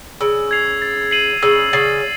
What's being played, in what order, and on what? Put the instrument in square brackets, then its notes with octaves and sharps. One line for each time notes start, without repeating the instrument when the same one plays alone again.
[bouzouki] C#3 [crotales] E6
[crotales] G#6 C7 F7
A6
C7 D#7 F#7
[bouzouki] C#3 [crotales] E6
[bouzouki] C#3 [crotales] A6 C7